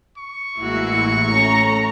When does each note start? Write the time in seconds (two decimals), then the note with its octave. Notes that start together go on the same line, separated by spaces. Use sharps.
0.17 C#6
0.58 A1 G#3 A#3 E4 F#4
1.31 A3 C#4 A#5